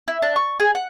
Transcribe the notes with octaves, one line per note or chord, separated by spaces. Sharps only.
E4
D4
C#6
G#4
F#5